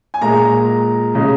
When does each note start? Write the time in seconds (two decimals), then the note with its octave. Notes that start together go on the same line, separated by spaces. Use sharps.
0.14 G#5
0.21 A#2 G#3 A#5
1.15 C#3 G#3